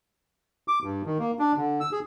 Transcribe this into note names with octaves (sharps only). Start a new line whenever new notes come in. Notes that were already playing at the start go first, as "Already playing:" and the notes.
D6
G2
D#3
A#3
D4
D3
E6
G#4